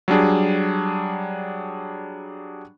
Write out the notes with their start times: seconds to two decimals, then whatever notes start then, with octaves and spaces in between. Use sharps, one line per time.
0.08 F#3 G3 D4 G#4